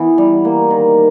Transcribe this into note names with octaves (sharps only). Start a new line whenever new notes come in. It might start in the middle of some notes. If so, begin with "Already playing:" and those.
Already playing: E3 B3
G3
A#3
D#3